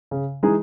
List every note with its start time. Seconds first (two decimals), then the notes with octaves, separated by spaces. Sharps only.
0.11 C#3
0.43 E3 G#3 D#4 G#4